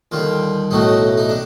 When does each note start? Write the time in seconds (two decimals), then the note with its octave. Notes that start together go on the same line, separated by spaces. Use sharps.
0.12 D#2 D3 G3 F4
0.71 B1 A2 F#3 A3 D#4
1.17 D#4
1.29 D4